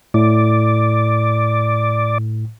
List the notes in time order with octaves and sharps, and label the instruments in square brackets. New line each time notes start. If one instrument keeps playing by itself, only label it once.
[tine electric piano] A2 [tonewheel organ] D5